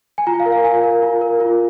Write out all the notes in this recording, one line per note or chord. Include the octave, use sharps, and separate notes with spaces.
G#5
F4 A#5
F5
A#4
F5
F4 G#5
A#4
F4
A#4
F4